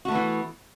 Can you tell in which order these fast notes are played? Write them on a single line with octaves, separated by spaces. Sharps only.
F#4 A3 B3 E3